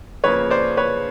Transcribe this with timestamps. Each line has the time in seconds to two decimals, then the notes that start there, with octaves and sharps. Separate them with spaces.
0.24 F2 C#3 F3 A#3 B4 C#5
0.50 C5 D5
0.77 B4 C#5